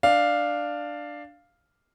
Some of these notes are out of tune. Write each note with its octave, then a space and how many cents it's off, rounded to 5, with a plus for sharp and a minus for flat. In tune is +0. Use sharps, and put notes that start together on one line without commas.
D4 +5 F5 +0